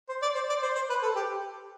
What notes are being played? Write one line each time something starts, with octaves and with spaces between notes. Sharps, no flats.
C5
D5
C5
D5
C5
C5
B4
A4
G4